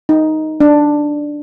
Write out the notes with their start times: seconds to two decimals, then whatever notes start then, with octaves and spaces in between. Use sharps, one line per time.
0.09 D#4
0.60 D4